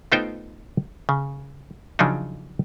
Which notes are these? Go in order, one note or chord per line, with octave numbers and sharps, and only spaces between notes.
A3 B3 D#4 F4 C5 G5
C#3
C#3 F3 F#3 D4 D#4